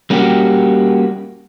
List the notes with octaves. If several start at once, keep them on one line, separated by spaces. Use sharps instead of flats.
G3 A#3 C#4 F#4 G4